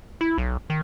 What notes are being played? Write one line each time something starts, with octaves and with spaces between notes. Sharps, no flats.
E4
B1
D#3